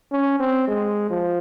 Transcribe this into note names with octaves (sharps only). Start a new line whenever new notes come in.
C#4
C4
G#3
F3